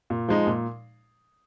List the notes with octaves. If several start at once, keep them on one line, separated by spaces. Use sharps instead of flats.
A#2
F3 G#3 D#4
A#2